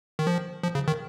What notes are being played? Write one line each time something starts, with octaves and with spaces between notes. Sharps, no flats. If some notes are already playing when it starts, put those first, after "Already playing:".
D#3
F3
F3
C#3
D#3